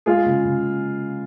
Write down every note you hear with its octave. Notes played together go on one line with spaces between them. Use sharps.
G#3 F4 G#4
C#3
C#3